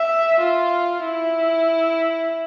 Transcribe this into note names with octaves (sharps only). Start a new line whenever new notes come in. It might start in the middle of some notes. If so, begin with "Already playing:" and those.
Already playing: E5
F4
E4